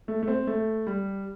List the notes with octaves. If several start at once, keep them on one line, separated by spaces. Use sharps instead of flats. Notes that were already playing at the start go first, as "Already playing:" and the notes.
A3
A3
C4
A3
G3